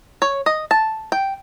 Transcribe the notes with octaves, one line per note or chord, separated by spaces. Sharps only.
C#5
D#5
A5
G5